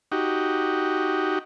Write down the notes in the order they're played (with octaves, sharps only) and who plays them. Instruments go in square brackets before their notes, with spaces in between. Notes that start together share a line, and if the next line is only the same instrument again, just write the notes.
[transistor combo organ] D#4 F#4 G4